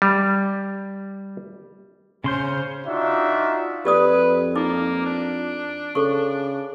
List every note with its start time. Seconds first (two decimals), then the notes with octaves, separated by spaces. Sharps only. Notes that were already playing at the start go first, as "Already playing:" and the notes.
0.02 G3
2.24 C#3 C#4 C5 C6 G6
2.85 D4 D#4 F4 F#4 E5
3.85 F2 G4 B4 D5 D#6
4.56 A#3 D#4 D6
5.06 D4
5.95 C#3 A4 C#6